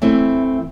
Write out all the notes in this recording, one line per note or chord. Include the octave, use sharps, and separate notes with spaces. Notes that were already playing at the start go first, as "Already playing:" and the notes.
E3 A3 C4 E4 E5